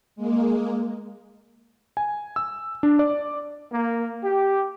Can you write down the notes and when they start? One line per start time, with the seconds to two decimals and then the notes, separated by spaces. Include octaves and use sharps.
0.16 G#3 A#3
1.97 G#5
2.36 E6
2.83 D4
2.99 D5
3.72 A#3
4.23 G4